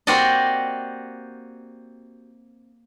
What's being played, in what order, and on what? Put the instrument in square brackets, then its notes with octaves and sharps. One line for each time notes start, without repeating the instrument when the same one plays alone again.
[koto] A#3 C4 F#4 G4 D5 D#5